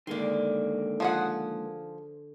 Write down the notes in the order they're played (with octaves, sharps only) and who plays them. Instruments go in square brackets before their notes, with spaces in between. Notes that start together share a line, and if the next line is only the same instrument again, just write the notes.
[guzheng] D3 C6 [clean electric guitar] D#3 G#3 A#3
[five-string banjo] F3 G#4 F#5